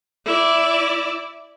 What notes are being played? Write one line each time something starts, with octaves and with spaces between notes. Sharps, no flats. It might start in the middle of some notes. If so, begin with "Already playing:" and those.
E4 D5